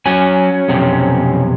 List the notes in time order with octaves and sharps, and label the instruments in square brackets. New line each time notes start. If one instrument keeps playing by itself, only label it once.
[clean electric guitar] F#3 F#4 G#5 [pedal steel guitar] C#4
[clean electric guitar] B1 F2 C3